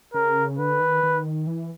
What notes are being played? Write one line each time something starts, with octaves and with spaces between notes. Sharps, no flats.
C#3 A#4
D3 B4
D#3
D#3
E3